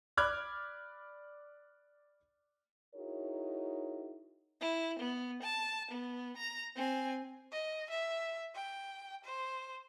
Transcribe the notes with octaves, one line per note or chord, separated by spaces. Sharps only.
D5 B5 D6 F6 F#6 G#6
D#4 E4 F#4 G#4 A#4 C#5
E4
B3
A5
B3
A#5
C4 G#5
D#5
E5
G5
C5